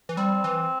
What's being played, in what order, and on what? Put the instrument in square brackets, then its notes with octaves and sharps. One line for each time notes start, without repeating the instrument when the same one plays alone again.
[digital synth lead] E3
[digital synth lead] G3 [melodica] C4
[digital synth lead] E3